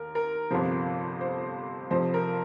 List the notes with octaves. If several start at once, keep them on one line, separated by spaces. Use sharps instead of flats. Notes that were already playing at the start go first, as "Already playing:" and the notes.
Already playing: D#2 A#4
A#4
G1 F2 C3 F3 C5
C5
F1 F2 C3 F3 C5
A#4